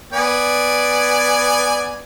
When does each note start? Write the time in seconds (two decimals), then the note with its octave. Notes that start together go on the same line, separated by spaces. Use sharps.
0.12 B3 D5 G#5